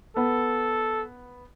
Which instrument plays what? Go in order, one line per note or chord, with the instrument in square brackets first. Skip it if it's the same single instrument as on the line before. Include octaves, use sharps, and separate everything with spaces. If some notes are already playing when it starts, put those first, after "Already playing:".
[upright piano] B3 [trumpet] A4